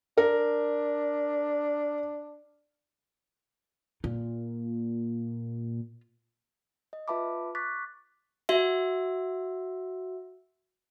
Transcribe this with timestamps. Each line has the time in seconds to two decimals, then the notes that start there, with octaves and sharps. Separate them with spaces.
0.18 D4 A#4
4.04 A#2 F4
6.93 D#5
7.08 F4 B4 E5 A5 B5 D6
7.55 C#6 D6 F#6 A6 B6
8.49 F#4 E5